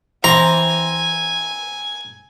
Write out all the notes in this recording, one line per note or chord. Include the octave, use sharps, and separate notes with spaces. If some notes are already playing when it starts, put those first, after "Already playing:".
E3 C4 G#5 A#5